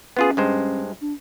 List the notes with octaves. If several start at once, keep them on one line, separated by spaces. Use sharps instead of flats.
B3 C#4 F4 G#4
G2 G#3 C5
D4